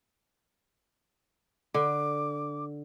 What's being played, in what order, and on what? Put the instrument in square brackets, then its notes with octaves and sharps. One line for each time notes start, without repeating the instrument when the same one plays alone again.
[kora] D3 [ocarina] D6